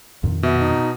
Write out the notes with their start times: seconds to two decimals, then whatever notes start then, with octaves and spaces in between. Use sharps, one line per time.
0.23 F2 A#2 D#3
0.43 B2 E5
0.60 D#4